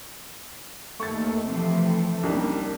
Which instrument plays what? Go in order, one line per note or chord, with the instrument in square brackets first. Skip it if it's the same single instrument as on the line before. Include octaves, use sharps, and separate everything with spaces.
[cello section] D#2 [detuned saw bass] A3 [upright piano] C#6 A6
[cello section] C3 E3 F3
[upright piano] C2 D#3 D4 [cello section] G3 A#3 C#4